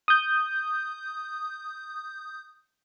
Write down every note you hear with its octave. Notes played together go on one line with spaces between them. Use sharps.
D#6 G6